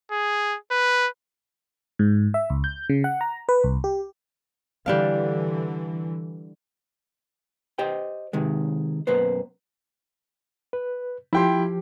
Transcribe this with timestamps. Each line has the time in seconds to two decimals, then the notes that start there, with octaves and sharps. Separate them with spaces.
0.11 G#4
0.71 B4
1.99 G#2
2.34 E5
2.50 C#2
2.64 G6
2.89 C#3
3.04 F#5
3.21 A#5
3.49 B4
3.64 C2
3.84 G4
4.86 D3 E3 G3 D4 F5
7.78 G4 C5 D#5 G5
8.33 C3 D#3 G#3
9.07 F#2 B2 A#3 B4 C5
10.73 B4
11.33 F3 E4 G4 G5 C6